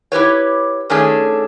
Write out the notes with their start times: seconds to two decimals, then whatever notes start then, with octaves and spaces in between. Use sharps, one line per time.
0.12 E4 G4 B4 C#5
0.90 D#3 A3 C#4 D4 G#4 A4